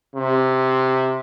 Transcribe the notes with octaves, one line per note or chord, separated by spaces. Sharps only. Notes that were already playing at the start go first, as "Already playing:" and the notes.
C3